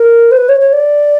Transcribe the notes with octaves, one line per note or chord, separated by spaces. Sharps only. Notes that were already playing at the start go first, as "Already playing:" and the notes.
Already playing: A#4
C5
B4
C#5
C#5
D5